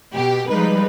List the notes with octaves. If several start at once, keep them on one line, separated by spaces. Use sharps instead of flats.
B2 G4
F3 G3 G#3 D#4 B4